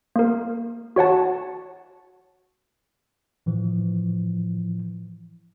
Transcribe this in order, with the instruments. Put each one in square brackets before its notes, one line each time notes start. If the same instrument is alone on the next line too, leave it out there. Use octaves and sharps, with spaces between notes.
[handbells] A#3 A#4
F#4 C#5 F#5 A5
[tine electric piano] A2 E3 F3